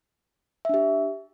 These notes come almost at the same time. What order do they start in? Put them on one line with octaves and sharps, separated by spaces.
E5 D4 G4